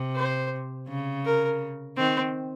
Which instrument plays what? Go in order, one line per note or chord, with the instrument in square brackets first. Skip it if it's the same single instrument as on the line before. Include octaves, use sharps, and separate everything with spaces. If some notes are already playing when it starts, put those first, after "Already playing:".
Already playing: [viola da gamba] C3
[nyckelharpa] C5
[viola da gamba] C#3
[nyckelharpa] A#4
[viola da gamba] D#3 [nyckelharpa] C4